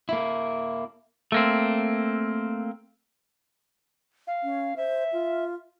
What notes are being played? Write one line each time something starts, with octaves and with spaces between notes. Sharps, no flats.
A#3 E4
A3 A#3 C4
F5
C#4
C5 E5
F4